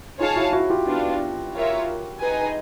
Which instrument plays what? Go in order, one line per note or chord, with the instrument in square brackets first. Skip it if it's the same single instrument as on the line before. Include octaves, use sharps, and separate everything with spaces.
[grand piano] D#4 F4 [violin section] G#4 C#5 F5 A5
[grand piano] E4 F#4
E4 F#4
F4 G4
[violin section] B3 D4 F4
F4 A#4 C#5 E5
D#4 G#4 B4 D#5 G#5